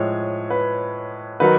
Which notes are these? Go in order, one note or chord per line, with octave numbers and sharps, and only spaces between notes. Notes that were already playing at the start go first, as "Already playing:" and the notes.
Already playing: A2 F3 G#3 C#5
B4
D#3 F#3 B4